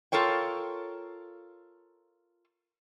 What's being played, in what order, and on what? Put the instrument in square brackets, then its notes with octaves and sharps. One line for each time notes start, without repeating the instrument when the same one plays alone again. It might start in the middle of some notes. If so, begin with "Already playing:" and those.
[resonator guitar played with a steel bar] F4 A4 A#4 C#5 G5